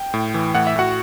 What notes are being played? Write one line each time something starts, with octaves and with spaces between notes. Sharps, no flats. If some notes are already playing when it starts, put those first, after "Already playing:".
Already playing: G5
A2
E3
A2 F#5
E5
A2 F#4 F#5